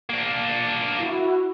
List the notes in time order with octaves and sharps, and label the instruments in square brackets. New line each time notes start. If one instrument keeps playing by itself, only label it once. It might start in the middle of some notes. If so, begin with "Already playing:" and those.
[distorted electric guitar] A#3 D4
[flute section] E4 F#4